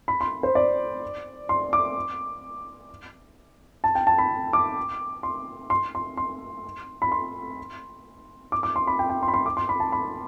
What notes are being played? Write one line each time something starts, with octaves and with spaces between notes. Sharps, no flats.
B5
C6
C5
D5
C6
D6
A5
G5
A5
B5
D6
C6
C6
C6
C6
B5
C6
D6
D6
C6
B5
G5
G5
C6
B5
C6
D6
C6
B5
A5
B5